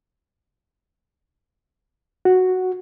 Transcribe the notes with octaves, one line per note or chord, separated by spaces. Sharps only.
F#4